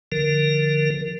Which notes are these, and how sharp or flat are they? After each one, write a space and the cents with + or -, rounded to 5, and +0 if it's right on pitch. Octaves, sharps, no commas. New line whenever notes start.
D3 +0 F3 -25 A#4 +0